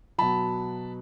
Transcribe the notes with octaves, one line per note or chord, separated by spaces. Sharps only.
B2 F#3 A5 B5